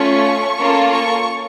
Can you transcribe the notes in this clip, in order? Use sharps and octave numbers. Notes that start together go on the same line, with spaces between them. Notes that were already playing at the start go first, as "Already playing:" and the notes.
Already playing: A3 C#4 F4 C#6
A#3 C#4 F4 A4
C#6